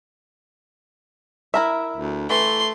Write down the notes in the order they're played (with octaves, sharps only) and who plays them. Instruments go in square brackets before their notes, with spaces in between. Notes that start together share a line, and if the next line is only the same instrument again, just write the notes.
[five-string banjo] E4 A#4 E5
[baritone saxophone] D2
[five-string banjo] E3 [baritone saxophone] A3 [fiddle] C6